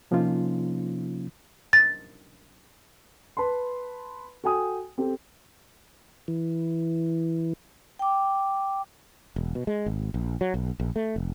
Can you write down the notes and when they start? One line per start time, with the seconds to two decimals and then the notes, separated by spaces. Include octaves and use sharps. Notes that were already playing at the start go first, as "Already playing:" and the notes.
0.11 C3 F3 A#3 C#4 D#4 F4
1.73 A6
3.37 B4 A5 B5 C6
4.44 F#4 A4 G5 G#5 D#6
4.98 C4 G4 A4
6.28 E3
7.99 G5 D6
9.36 E1
9.55 B2
9.67 G#3
9.86 G#1
10.14 A#1
10.41 F#3
10.54 B1
10.80 A#1
10.96 A3
11.16 F1